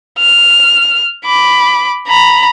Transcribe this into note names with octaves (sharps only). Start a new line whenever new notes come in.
F6
B5 D6
A#5 B5